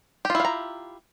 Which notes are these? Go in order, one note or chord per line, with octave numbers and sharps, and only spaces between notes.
E4 F4 G4 F5 A#5